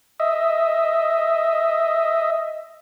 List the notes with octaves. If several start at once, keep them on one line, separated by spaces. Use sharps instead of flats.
D#5 E5